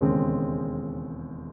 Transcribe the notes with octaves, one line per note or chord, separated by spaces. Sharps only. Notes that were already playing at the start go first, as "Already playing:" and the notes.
E1 D#2 C#3 G#3 C4